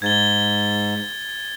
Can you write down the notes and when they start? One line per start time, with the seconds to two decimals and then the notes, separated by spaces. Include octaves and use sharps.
0.02 G#2 G#6 A6 G7